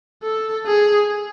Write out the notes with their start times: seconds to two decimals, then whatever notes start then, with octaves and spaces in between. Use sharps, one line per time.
0.24 A4
0.66 G#4